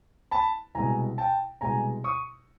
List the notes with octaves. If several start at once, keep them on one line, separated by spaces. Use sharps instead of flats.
A5 B5
C2 B2 G#3 G#5 A#5
G5 A5
C2 B2 G#3 G#5 A#5
C#6 D#6